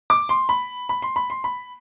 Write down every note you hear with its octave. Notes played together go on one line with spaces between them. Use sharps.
D6
C6
B5
B5
C6
B5
C6
B5